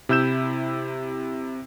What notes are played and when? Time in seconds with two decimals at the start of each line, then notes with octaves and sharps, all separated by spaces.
0.09 C3 E4 E6 G6 E7